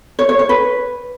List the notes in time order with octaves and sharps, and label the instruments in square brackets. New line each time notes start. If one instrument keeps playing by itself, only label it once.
[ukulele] C#5
C#5
C#5
B4